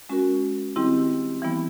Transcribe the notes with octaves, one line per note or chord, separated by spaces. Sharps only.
G#3 C#4 F#4 A#4
D#3 G3 C4 E4 G4
E3 G3 B3 E4